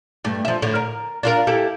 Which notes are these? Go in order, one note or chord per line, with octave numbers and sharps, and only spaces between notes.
G2 A3
F3 E5
A2 D3
A#4
D4 F4 A#4
E4 G4 A4